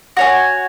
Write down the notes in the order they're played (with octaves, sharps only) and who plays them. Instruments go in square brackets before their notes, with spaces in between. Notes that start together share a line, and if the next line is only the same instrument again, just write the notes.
[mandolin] F#4 C#5 G#5